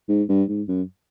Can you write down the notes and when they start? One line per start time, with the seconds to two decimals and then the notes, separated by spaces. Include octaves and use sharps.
0.09 G#2
0.29 G2
0.48 G#2
0.68 F#2